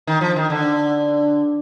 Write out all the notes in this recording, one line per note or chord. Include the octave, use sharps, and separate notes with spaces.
D#3
F3
D#3
D3